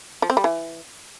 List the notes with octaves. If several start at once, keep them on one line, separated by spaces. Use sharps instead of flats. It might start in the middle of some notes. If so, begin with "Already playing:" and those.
F3
C4
G3
E3